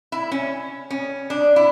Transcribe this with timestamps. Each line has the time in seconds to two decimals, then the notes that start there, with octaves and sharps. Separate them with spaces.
0.12 E4
0.31 C#4
0.90 C#4
1.30 D4
1.56 E4